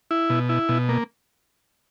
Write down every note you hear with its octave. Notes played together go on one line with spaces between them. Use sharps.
E4
B2
E4
B2
A#3